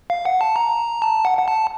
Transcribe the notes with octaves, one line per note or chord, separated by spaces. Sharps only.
F5
F#5
A5
A#5
A5
F#5
F#5
A5